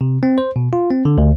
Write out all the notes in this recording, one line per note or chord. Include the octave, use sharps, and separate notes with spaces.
C3
C4
C5
B2
F4
C4
D3
D2